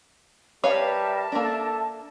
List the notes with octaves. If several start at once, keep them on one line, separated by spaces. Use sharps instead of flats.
G3 A#4 B4 C#5 E5 F5 A5
A#3 D4 A4